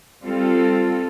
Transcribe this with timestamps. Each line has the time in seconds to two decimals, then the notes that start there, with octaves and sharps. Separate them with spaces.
0.24 G3 C4 F4 A4